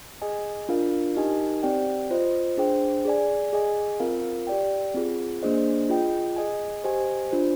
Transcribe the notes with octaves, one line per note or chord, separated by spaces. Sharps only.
G#4 D#5 G#5
D4 F4 A#4 F5
D#4 G4 A#4 D#5 G#5
C4 G4 D5 G5
F4 C5 D#5
D4 G#4 C5 G5
G#4 D5 G#5
G#4 D#5 G#5
C4 F4 A#4 F5
G4 D5 G5
C4 F4 G#4
A#3 D4 G#4 C5 D#5
F4 G#4 D#5 G5
G#4 D#5 G#5
G4 C5 D#5 G#5
D4 F4 C5